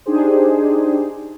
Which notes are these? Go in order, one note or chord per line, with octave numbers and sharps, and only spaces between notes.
D4 D#4 G4 G#4 C5